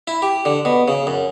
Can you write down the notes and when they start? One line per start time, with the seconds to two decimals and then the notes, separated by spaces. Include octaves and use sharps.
0.07 E4
0.22 G4
0.45 D3
0.65 B2
0.88 C#3
1.07 F#2